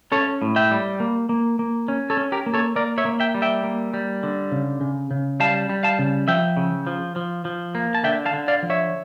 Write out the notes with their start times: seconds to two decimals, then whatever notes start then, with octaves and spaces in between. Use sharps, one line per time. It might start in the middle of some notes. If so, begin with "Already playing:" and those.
0.12 C#4 A4 C#5
0.42 A2
0.56 E5 G5
0.71 G3
1.00 A#3
1.29 A#3
1.59 A#3
1.88 C#4
2.10 A4 C#5
2.17 C#4
2.32 G4 A#4
2.46 A#3
2.54 A4 C#5
2.76 A#3 A#4 D5
2.98 C#5 E5
3.05 A#3
3.20 E5 G5
3.35 G3
3.42 E5 G5
3.63 A#3
3.94 G3
4.23 D3
4.52 C#3
4.81 C#3
5.11 C#3
5.40 G3 F5 A5
5.69 G3
5.83 F5 A5
5.99 C#3
6.28 F3 E5 G5
6.57 C#3
6.87 F3
7.16 F3
7.45 F3
7.75 A#3
7.95 A5
8.04 D3 E5 G5
8.26 F5 A5
8.33 D3
8.48 D5 F5
8.63 F3
8.70 C#5 E5